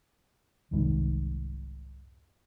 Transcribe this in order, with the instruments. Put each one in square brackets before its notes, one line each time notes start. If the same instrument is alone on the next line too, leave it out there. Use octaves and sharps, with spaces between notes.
[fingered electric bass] F1 C2 G#2 D#3